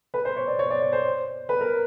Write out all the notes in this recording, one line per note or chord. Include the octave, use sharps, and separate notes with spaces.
B4
C5
C#5
D5
C#5
D5
C#5
C5
B4
A#4